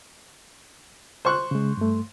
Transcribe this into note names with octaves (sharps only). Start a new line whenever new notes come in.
C5 C#6 F#6
C#3 G#3
G2 A3